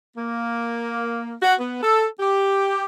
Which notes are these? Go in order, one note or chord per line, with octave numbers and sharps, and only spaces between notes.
A#3
F#4
B3
A4
G4